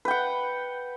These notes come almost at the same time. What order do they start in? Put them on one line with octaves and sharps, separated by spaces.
B4 G5 F#5